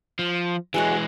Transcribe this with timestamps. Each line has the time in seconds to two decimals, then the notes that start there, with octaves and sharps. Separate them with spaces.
0.19 F3
0.74 E3 F#3 G#3 F#4 G#4